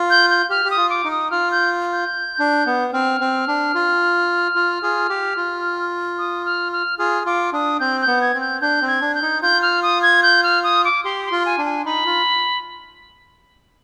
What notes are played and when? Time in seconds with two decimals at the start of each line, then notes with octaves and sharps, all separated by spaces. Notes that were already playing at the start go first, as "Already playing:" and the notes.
Already playing: F4
0.10 G6
0.30 G6
0.50 G4 F6
0.65 G4
0.71 D#6
0.77 F4
0.90 D6
1.04 D#4
1.11 D#6
1.31 F4 F6
1.52 G6
1.93 G6
2.39 D4
2.66 B3
2.93 C4 F6
3.21 C4
3.48 D4
3.75 F4
4.55 F4
4.83 F4 G#4
5.09 G4
5.37 F4
6.18 D#6
6.45 F6
6.73 F6
6.99 F4 G#4 F6
7.26 F4 D6
7.53 D4 D#6
7.80 C4 G6
8.01 G6
8.07 B3
8.21 G#6
8.34 C4
8.41 G6
8.61 D4 G6
8.82 C4
8.88 G#6
9.01 D4
9.15 G6
9.22 D#4
9.42 F4 G6
9.62 F6
9.83 D#6
10.03 G#6
10.23 G6
10.44 F6
10.64 D#6
10.85 D6
11.04 G4 C6
11.25 C6
11.31 F4
11.46 G#5
11.58 D4
11.66 G#5
11.86 D#4 B5
12.06 F4